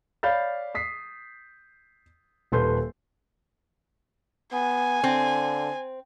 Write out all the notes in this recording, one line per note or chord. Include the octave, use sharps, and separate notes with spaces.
C#5 D5 F5 B5 G6 A6
D#6 B6 C7
D#1 A4 B4 C6 G6
B3 G#5
D3 C4